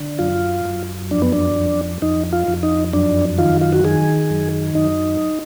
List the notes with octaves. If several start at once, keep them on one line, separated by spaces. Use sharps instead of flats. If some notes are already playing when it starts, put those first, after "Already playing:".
Already playing: D3
F#2 F4
F#2
F2 D4
B3
D4
F2
F2 D#4
F4
F2
D#4
F#2 D4
D#3 F4
F4
F#4
D#3 G#4
F#2
F#2 D#4